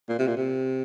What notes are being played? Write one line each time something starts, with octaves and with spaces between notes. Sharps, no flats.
A#2
C3
A#2
C3